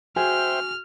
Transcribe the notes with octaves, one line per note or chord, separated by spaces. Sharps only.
F#4 G#4 C5 E5 G5 F6